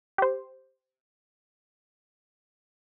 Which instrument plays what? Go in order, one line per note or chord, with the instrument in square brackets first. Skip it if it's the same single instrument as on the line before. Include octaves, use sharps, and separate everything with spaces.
[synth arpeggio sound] G4 C5